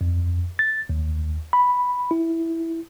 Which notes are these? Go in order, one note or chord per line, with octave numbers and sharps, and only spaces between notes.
F2
A6
D#2
B5
E4